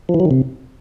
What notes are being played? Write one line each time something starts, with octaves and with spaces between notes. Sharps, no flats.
F3
E3
F#3
D#3
C3